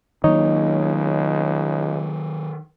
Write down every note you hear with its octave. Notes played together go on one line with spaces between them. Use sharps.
C#2 D#3 F#3 A#3 D#4 C#5 D#5